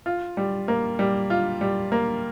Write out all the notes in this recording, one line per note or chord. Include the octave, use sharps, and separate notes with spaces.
F4
G3
A#3
G3
F4
G3
A#3